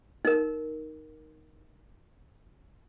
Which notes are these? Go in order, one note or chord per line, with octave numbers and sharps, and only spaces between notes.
D#4 A#4